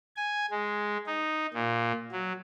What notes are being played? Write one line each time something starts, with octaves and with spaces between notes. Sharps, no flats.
G#5
G#3
D#4
A#2
F#3